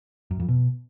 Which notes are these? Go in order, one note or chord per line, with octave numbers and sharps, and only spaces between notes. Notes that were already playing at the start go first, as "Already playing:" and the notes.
F#2
F2
B2